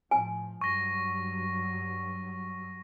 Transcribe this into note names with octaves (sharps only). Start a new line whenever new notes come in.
A2 F3 G#5
G2 F#3 C#6 A#6